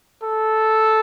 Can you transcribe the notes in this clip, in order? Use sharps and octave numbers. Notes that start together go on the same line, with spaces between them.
A4